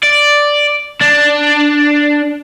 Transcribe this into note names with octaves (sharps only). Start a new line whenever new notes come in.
D5
D4